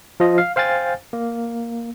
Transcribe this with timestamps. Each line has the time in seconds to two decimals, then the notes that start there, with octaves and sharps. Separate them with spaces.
0.20 F3 F4 D#5
0.38 F5
0.56 C5 F5 G5 G#5 A6
1.13 A#3